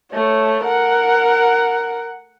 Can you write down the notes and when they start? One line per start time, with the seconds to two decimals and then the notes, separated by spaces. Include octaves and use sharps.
0.13 A3 C#5
0.65 A#4 F#5